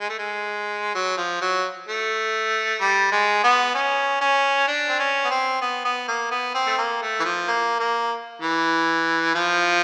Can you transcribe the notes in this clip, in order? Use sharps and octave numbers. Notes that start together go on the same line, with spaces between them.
G#3
A3
G#3
F#3
F3
F#3
A3
G3
G#3
B3
C#4
C#4
D4
C4
C#4
B3
C4
B3
B3
A#3
B3
C4
A3
A#3
A3
E3
F3
A#3
A#3
E3
F3